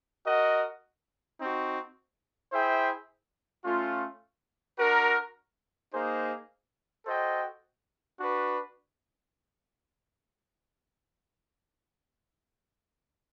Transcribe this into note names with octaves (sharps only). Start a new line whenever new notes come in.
F#4 A#4 D#5 F#5
C4 D#4 F#4
E4 G#4 C5 E5 G5
A3 C#4 F4
D4 F#4 A#4
A#3 D#4 G#4 C5
F#4 A4 C5 D#5 G5
D4 F#4 B4